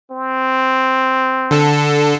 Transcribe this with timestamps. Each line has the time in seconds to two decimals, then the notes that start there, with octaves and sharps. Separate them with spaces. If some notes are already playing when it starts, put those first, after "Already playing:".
0.11 C4
1.51 D3 A4